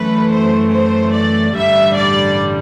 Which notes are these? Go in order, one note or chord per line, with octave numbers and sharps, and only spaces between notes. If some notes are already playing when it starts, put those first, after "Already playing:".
Already playing: F#2 E3 A3 B4
C5
C5
D5
A1 G2 D3 G3 E5
D5